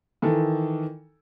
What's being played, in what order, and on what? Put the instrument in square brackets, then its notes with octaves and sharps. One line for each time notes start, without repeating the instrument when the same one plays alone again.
[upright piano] D#3 E3 A4